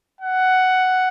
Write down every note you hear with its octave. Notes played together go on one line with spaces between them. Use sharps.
F#5